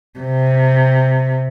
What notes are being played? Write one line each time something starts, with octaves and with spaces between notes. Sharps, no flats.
C3